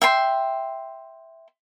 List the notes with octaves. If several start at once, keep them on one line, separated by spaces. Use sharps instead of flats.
E5 G5 C6